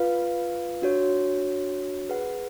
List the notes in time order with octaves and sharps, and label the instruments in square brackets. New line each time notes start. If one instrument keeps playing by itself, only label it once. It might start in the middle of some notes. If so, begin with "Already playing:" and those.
Already playing: [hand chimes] F4 B4 F5
D4 F#4 C#5
G#4 B4 F#5